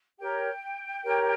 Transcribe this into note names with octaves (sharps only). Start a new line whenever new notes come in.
G4 A#4 C#5 G5
G4 A#4 C#5